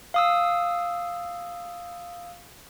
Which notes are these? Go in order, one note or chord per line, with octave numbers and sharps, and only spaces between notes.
F5 D#6 E6